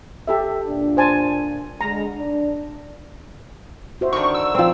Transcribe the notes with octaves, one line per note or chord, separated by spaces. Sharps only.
G4 A4 E5
A#2 D4
C5 G#5 A5
D3 G#3 A#5
D4
F#4 C5 E5
D3 D#3 C#6
E6
F3 C4